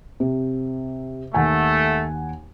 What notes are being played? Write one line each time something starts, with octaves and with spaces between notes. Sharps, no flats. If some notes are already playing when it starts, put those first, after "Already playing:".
C3
D#2 A3 F#5 G#5